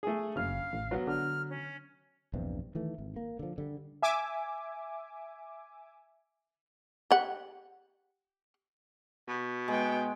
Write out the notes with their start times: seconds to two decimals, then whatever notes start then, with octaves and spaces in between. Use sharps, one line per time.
0.03 A3 G#4
0.36 F#1 C#3 F5 F6
0.73 A1
0.91 F#3 B3
1.07 D3 F6
1.49 C#4
2.33 A#1 E2 G2 C3
2.75 D#3 E3 A3
2.98 G#1
3.16 A#3
3.39 D3 F3
3.58 D3 G3
4.02 E5 G#5 D6
7.11 G4 F#5
9.28 B2
9.68 G#3 B3 G5